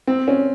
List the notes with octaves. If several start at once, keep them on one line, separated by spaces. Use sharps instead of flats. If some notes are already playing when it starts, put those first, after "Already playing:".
C4
C#4